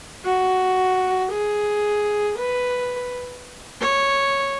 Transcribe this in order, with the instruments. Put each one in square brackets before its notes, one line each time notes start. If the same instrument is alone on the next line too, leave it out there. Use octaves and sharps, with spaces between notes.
[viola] F#4
G#4
B4
C#5